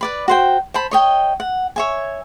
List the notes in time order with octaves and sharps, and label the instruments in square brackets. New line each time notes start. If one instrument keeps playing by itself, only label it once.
[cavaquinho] B4 D5 B5
F#4 C5 G5
C5 A5 B5
C#5 D#5 G5
F#5
C#5 E5 G#5